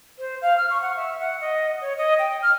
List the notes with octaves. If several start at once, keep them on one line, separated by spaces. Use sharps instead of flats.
C5
F5
F6
C#6
F#5
E5
F#5
D#5
C#5
D#5
G5
F6